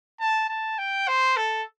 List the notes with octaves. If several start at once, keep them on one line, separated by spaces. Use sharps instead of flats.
A5
A5
G5
C5
A4